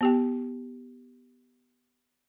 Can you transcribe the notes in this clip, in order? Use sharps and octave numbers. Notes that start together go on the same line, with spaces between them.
B3 G4 G5